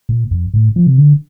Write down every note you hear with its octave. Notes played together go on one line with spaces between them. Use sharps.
A#2
F2
A2
F3
C3
D3